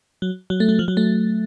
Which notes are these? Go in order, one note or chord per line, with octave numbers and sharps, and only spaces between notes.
F#3
F#3
A3
F#3
F3
F#3
A3